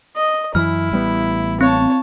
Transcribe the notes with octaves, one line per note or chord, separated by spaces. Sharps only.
D#5
F#2 E3 E4 F6
A1 G3 B3
C4 C#5 A5